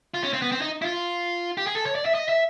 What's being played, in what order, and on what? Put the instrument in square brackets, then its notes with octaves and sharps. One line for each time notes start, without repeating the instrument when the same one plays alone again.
[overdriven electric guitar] F4
C#4
C4
B3
C4
D#4
E4
F4
G4
G#4
A4
C#5
D5
E5
D#5
E5